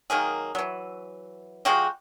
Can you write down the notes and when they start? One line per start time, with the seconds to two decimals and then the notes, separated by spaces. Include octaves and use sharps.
0.10 D#3 F#3 A#3 G#4
0.55 E3 F#3
1.65 F3 G#3 F#4 G4